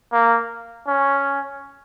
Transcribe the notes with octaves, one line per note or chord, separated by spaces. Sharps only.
A#3
C#4